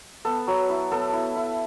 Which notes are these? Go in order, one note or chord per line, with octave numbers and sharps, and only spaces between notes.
B3 A4
F#3
E4
B3 A4
E4
E4